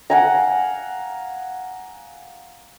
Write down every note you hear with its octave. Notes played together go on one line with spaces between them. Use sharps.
F5 F#5 G#5 A#5